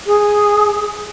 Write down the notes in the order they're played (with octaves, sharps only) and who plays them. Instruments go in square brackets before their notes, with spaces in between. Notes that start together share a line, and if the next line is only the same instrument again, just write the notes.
[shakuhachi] G#4